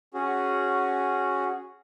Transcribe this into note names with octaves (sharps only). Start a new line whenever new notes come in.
C#4 F#4 G#4